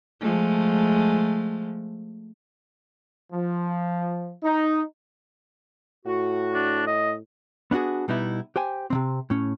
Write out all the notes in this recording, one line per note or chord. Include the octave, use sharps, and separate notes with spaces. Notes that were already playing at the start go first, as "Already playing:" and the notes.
F3 G#3 A3
F3
D#4
A2 F#4
D4
D#5
B3 D4 F4 F#4 G#4
B2 G3 B3 D#4 E4
G4 C5 G5 G#5
C3 D#3 C4
A2 C#4